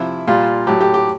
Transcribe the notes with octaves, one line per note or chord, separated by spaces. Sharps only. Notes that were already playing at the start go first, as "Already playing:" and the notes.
Already playing: C3 F3 E4
A#2 G3 F4
A2 F#3 G4
G4
G4